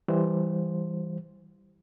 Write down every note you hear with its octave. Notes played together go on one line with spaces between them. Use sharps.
E3 G3 C5